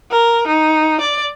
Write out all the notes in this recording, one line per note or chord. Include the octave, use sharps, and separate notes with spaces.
A#4
D#4
D5